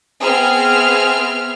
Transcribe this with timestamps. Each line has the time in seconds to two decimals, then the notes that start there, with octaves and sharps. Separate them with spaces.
0.21 B3 C4 G#4 E5 F6